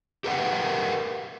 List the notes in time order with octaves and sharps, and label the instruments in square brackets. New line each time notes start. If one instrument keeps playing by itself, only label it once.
[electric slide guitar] G4 A#4 B4 F#5 G5